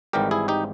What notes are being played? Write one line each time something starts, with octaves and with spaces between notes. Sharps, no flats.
G#1 G#2 E3 G3 G4 A#4
E4 G#4
D#4 G4